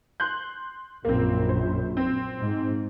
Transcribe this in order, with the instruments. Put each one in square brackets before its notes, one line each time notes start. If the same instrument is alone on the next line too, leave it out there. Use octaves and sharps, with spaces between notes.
[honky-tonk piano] C6 F#6 G6
[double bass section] A#1 F#2 [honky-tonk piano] A#3 C4
[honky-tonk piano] C5
C4
[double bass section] G#2